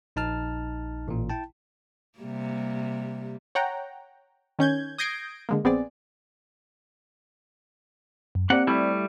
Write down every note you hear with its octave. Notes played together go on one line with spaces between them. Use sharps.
A#1 D#4 A5 F6
A1 A#2
E4 G5 A5
C3 G3 A#3
C#5 F#5 G5 A#5
D#3 C#4 G6 G#6
D#6 G6 G#6 A#6 C7 D7
D3 G#3 A#3
A#1 B3 C4 G#4 D5
F#2
A#3 C4 G4 D5 F#5
G3 A3 E4